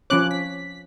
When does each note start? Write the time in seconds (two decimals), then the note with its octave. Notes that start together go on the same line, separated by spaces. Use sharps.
0.10 F3 C#4 C#5 D6 F#6
0.31 B6